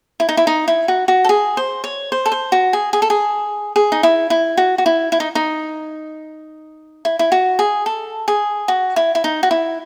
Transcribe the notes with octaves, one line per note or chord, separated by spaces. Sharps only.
E4
D#4
E4
D#4
E4
F#4
F#4
A4
G#4
C5
C#5
C5
A4
C5
F#4
G#4
G#4
A4
G#4
G#4
D#4
E4
E4
F#4
F#4
E4
E4
D#4
D#4
E4
E4
F#4
G#4
A4
G#4
F#4
E4
E4
D#4
F#4
E4